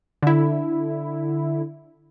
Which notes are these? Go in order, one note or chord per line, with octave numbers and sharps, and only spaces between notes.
D3 E4